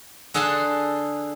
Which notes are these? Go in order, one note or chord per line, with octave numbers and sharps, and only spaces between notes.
D3 G#4 A4 F#5 A5 C6